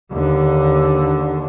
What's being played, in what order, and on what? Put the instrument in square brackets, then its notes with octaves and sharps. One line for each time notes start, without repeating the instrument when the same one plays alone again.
[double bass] D#2 D3